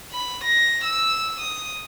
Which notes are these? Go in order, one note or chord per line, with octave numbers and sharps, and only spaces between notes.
B5
A#6
E6
D#6